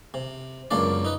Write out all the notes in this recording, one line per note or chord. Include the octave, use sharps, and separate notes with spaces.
C3
C#2 F#2 A#3 D4 D5
D#4 B4